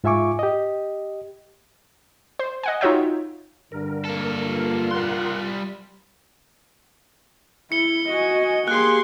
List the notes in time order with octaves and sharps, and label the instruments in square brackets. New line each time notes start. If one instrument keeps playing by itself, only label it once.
[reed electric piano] G#2 F4 E5 G#5 C#6 D6
G4 D#5
[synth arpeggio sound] C5
D#5 F#5 G#5
D#4 F4 F#4 C#5 E5 G5
[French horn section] G2 D3 [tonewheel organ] A#4
[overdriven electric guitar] A#3 A4
[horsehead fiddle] F4
[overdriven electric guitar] G3 C6 [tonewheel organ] A#4 F#5
[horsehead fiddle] E4 [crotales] C#7 G7
[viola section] F#4 [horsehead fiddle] D#5 G#5
[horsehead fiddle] A#3 G#4 [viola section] G4 C6 [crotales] F#6